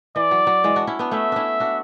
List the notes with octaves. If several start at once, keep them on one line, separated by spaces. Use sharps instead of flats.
E3 D5
F#3
F#3
E3 G#3
D4 F#4
C#4 E4
B3 D4
A3 C#4 E5
C#4 D4 E4
D4 F#4